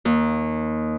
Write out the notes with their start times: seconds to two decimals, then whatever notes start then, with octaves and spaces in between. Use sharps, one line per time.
0.05 D#2